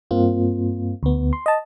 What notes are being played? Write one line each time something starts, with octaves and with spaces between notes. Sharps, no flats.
G2 A#3 C4 F4
D2 B3
C6
D#5 A5